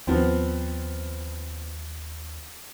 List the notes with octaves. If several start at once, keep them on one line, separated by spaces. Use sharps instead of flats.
D#2 F3 B3 C4